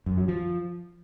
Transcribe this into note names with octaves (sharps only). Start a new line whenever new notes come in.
F#2
F#3
F3